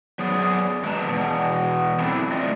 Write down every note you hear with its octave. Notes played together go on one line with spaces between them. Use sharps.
F#3 B3 G#4 D5
E2 F#3 G#3 B3 A5 A#5
E2 B2
F#3 A3 C4 D4 E4
A3 F4 D5 D#5